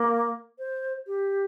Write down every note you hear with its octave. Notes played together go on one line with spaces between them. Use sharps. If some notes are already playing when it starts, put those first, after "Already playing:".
Already playing: A#3
C5
G4